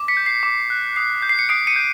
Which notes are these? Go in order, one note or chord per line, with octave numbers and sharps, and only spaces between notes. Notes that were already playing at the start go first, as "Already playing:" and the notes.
Already playing: D6
B6 C#7
G6
C7
D6
F#6
D#6 C7
G6
C7
C#7
D#6 C7 D7
C#7 D#7
G6